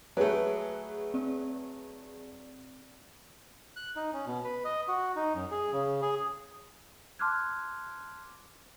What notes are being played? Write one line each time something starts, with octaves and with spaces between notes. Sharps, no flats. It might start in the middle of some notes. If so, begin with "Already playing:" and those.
F#3 A3 G#4 B4 C#5
C4 D5
F#6
D#4
C#4
B2
B4
D#5
F#4
D#4
F#2
G#4
C#3
G#4
A5 C6 D6 F6 F#6 G#6